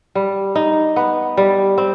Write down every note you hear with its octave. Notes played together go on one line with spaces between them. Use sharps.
G3
D#4
B3
G3
C4